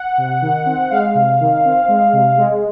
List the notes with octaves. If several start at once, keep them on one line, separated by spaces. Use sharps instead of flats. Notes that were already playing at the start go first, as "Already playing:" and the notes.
Already playing: F#5
C3
D#3
C4
G#3 F5
C3
D#3
C4
G#3
C3
G#3